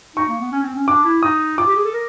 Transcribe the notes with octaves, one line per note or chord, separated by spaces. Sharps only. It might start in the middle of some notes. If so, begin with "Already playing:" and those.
D#4 C#6
A#3
B3
C#4
C4
C#4
D4 D6
E4
D#4 D#6
F4 D6
G4
G#4
A4
A#4